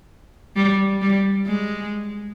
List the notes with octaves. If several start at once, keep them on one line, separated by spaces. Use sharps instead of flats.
G3
G3
G#3